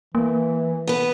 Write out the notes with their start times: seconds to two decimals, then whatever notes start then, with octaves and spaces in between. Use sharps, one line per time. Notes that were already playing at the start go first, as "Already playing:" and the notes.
0.15 E3 A#3
0.87 B3 B4